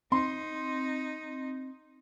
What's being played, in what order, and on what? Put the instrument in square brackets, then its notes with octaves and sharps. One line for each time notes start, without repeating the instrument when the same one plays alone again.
[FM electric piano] C4 [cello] D#4 [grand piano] C6